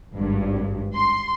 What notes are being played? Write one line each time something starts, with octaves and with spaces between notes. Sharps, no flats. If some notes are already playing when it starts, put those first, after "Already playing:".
G#1 G2
C6